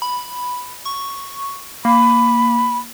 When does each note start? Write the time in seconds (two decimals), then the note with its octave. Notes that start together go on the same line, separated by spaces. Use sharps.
0.02 B5
0.85 C#6
1.85 A#3 B5